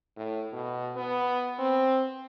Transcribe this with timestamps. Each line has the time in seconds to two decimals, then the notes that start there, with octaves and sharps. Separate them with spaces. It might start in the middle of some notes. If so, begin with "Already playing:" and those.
0.17 A2
0.53 B2
0.96 B3
1.59 C4